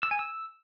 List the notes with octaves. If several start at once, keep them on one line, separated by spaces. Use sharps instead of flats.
E6
G#5
E6